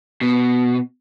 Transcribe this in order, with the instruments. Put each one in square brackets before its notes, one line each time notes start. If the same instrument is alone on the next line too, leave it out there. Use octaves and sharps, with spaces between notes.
[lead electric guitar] B2